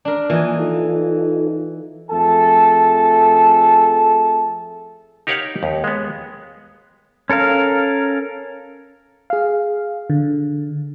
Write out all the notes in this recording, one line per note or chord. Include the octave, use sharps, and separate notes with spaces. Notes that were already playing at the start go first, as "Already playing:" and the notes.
D4 A#4
E3 F3 A#3 D#5 G#5
D#4 F4 A4
F2 A3 G#4 A4 A5
D#4 G4 A#4 C#5 F5 F#5
D#2
G#3 B3
C#4 A4 A#4 F5
G#4 F5
D3